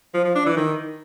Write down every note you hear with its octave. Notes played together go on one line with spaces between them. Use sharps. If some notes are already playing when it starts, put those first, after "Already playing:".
F3
F3
D4
E3
D#3